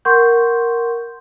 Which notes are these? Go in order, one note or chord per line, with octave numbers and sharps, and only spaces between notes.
A#4 F#5 C6 C#6 G6